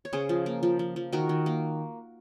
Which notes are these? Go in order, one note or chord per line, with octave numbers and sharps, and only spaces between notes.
C#5
C#3 G#4 C5
F3
A#3
F3
F3
F3
D#3 F#4 A#4
D#3
A#3